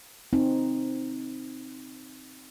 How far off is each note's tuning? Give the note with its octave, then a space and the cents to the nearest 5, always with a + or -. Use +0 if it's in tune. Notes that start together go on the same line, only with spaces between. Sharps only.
C4 +0 D#4 +0